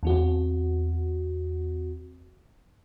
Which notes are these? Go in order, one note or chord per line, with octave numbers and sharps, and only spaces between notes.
E2 C4 F#4